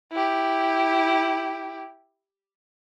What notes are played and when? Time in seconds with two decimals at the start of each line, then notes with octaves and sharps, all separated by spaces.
0.12 E4 G4